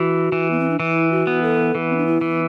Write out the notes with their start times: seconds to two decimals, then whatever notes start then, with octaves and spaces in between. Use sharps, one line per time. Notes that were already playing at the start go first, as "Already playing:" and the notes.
Already playing: E3 F#4
0.32 E3
0.51 B3
0.60 C4
0.70 D4
0.80 E3 E4
1.11 F#4
1.27 B3
1.42 A4
1.75 E3
1.89 C4
1.97 D4
2.07 E4
2.21 E3